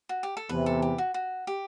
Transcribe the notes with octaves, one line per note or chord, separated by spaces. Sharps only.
F#4
G4
A4
E2 C3 E3 B4
A4
G4
F#4
F#4
G4